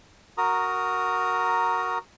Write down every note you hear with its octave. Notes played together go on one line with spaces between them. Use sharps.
F#4 A#4 A#5 D#6